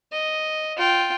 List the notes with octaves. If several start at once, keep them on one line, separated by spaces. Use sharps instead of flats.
D#5
F4 G5